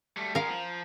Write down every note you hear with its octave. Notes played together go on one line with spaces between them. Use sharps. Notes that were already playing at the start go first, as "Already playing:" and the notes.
G3 A3
G#3 B3 A#4 F5
F3